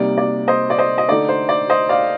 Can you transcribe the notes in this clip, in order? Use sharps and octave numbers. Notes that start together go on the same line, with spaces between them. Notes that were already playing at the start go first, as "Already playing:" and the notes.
Already playing: C3 G3 A#3 D#4 D5
D5
C5 D#5
D5
C5 D#5
D#5
D3 A3 D#4 D5
C5
D5
C5 D#5
D5 F5